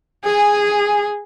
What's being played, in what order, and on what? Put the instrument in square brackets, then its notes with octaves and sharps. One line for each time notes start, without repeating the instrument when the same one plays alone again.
[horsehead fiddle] G#4 [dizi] G#5